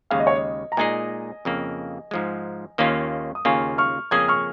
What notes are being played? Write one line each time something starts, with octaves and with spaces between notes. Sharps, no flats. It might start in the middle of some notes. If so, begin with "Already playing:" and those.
D#2 C#3 G#3 F5
D#5
C#5
D#5
A#5
A#2 G#3 D#4 G#4 D#5 G#5
F2 C#3 A#3
G#2 F3 G#3
D#2 D#3 A#3 C#4 F4
D#6
D#2 C#3 A#3 F4 G#5 C#6
C#6 F6
F2 C#3 A#3 C#4 G#4 D#6 G#6
C#6 F6